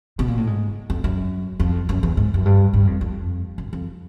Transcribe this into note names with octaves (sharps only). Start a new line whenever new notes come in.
B2
A#2
A2
G#2
F2
F#2
F2
F#2
E2
G#2
F#2
G2
G2
F2
F2
F#2
F2